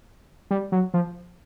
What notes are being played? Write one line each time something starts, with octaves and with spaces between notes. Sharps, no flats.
G3
F#3
F3